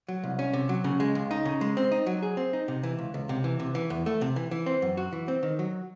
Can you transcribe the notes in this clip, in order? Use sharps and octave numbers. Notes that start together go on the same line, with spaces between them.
F#3
C2
C#4
C3
F#3
C#3
G#3
C#2
D#4
C#3
G#3
C4
D#4
F#3
G#4
C4
D#4
C3
E3
C#2
C#2
C3
E3
C3
E3
E2
A3
C3
E3
E3
C4
F#2
F#4
E3
C4
D#3
F#3